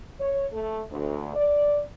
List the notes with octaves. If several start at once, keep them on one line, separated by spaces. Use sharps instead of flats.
C#5
A3
D2
D5